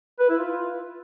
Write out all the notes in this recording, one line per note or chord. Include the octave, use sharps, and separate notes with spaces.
B4
E4
F4